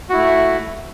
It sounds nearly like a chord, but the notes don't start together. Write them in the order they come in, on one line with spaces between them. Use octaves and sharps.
F#4 E4 A3